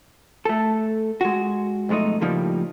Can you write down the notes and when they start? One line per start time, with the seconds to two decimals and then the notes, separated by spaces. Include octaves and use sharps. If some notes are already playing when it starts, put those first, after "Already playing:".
0.45 A3 A4
1.21 G#3 F#4
1.89 B1 F2 G#3 A3 D#4
2.21 A2 C#3 F3 G3 A#3 D#4